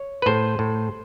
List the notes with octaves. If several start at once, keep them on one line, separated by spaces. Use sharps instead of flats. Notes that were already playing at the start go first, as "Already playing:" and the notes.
Already playing: C#5
B4
A2 C5
A2